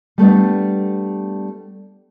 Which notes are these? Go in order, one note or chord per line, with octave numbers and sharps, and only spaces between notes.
G3 A3 B3 D4